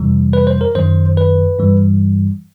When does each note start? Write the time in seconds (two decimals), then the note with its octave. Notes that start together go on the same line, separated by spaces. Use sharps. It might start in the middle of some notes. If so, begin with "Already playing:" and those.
Already playing: F2 C3 E3 G3
0.33 B4
0.47 C5
0.61 A#4
0.75 F#2 D#3 F#3 C5
1.17 B4
1.59 G2 E3 G3